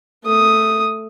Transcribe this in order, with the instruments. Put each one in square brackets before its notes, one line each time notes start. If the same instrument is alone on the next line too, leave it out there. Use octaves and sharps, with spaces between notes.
[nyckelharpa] A3 D#6